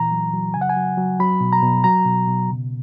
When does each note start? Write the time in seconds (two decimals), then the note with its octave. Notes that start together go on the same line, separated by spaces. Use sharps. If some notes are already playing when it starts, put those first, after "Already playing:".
Already playing: A#2 E3 A#5
0.11 F#3
0.33 F#3
0.54 C#3 G#5
0.61 F#5
0.69 G#5
0.76 F#3
0.97 F#3
1.20 F#3 B5
1.41 B2
1.53 A#5
1.62 B2
1.84 F#3 A#5
2.06 B2
2.27 B2
2.49 C#3